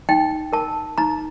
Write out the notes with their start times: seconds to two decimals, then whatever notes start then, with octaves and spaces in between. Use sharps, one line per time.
0.09 D#4 G5
0.53 A#4 A5
0.98 D#4 A#5